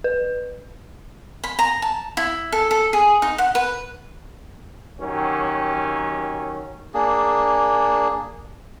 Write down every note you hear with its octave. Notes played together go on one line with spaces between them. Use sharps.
B4
B5
A#5
A5
E4
A4
A4
G#4
D#4
F#5
B4
D#3 F#3 C#4 G4
A#3 D4 G#4